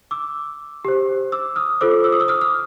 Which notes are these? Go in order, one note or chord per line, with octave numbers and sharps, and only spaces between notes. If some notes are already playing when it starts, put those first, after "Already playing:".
D6 E6
G4 C5
D6 E6
D#6 F6
F4 A4 C5 D6 E6
E6
D#6
D6 E6
D#6 F6
F6